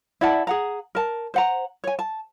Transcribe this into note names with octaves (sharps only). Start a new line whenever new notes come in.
E4 D5 F#5 A5
G#4 F#5 A#5
A#4 A5
C5 F#5 A#5
C#5 G#5
A5